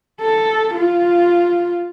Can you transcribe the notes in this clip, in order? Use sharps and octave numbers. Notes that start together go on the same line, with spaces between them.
A4
F4